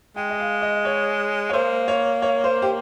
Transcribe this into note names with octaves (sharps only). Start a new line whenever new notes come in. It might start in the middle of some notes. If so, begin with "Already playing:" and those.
G#3 G5
D#5
F5
D#5
C#5
C#5
A#3 C5
C#5
C#5
C5
G4